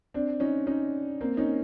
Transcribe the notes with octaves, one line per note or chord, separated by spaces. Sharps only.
C4 D4
C#4 D#4
C#4 D#4
A#3 C4
C#4 D#4